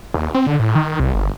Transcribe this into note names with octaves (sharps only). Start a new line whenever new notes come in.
D#2
C4
D3
A2
D#3
C2
G1